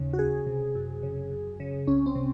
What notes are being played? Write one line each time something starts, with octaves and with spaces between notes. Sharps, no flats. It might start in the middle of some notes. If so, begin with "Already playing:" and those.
Already playing: D#2 C#3
F#4
C#2 G#4
C3
F#2
C#3
F#2
C#3
C2 C#4
C4
C3